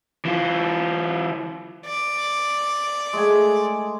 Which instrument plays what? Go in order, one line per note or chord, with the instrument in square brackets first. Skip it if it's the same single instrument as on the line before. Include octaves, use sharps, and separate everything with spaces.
[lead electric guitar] E3 F4
[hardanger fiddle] D5
[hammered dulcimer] G#3 A3 G#5